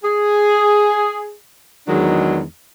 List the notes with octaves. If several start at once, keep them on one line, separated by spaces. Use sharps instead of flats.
G#4
E2 D#3 F#3 G#3 D4